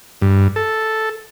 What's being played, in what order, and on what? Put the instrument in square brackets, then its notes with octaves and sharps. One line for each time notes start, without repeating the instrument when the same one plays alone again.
[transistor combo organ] G2
A4